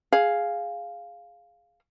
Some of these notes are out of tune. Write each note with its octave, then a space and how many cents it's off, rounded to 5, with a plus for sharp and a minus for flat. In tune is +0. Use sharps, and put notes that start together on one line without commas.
G#4 +0 F5 +0